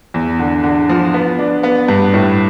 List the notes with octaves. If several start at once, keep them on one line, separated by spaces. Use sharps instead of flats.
E2
D3
D3
F3
B3
D4
B3
G2
A2